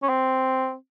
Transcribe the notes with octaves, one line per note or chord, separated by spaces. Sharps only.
C#4
C4